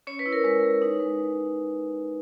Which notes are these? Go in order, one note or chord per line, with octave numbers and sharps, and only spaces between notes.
C#4 C#5
B4
E4
A#4
G#3 B4
G#3
D#4
G#3